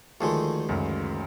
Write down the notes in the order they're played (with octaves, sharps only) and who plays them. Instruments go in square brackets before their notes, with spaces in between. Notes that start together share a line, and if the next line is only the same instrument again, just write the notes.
[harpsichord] D2 D#3 G#3 [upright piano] F3 G#4 A4
[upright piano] C#2 F#2